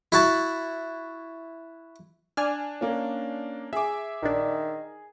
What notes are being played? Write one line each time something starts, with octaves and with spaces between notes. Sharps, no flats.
E4 F#4 A5
D4 D5 G#5 F6
A#3 C#4
G#4 E5 G#5 D6
A#1 D#3 D4